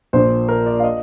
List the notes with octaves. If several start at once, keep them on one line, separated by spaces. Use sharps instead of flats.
A#1 A#2 C5
A#4
D5
F5
D#5